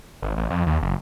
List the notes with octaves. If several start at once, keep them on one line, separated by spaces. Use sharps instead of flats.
G#1
A1
F2
D#2
F#1